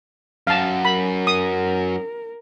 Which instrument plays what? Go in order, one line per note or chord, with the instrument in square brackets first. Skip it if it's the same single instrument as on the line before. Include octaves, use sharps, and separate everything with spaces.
[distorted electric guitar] F#2 [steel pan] F5 A5
[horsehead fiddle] A#4 [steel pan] B5
[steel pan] D#6